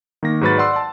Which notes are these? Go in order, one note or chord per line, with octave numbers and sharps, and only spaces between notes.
D#3 A#3 A#6
G#2 F#3 F#4 B4 B5 A6
D5 F#5 C6 E6
A5